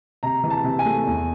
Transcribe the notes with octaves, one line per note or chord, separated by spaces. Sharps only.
C3 A#5
E3
A5
C3
G#5
A3
E2